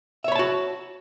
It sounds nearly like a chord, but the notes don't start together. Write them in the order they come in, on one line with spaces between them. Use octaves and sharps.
E5 C#5 B5 A5 F#4